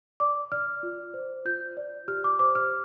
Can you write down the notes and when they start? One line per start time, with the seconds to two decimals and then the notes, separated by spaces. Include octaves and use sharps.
0.20 D5 D6
0.52 D5 F6
0.83 F4
1.14 C5
1.45 F4 G6
1.77 D5
2.08 G4 F6
2.24 D6
2.39 C5 D6
2.55 F6